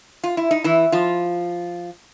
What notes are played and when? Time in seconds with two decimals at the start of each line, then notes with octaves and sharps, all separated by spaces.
0.24 F4
0.37 E4
0.51 D#4
0.64 E3 E4
0.92 F3 F4